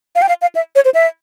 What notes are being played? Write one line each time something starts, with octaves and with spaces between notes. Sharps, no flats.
F5
G5
F5
F5
E5
C#5
C5
E5